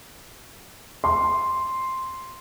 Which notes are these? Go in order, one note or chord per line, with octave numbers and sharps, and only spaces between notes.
C6